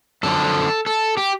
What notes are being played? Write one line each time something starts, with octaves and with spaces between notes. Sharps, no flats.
F#2 D3 F3 A4
A4
G4